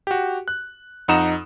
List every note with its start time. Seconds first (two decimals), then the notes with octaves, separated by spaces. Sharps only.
0.07 F#4 G4
0.48 F#6
1.08 F2 D#4 F#5 A#5 D#6 E7